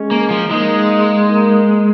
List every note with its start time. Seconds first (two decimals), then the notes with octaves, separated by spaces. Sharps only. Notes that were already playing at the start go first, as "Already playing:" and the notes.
Already playing: G#3 C#4
0.11 A#3
0.30 F3
0.50 G#3 A#3 D#4
1.29 A#3 D#4